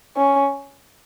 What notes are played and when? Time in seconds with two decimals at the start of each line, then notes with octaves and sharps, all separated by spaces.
0.17 C#4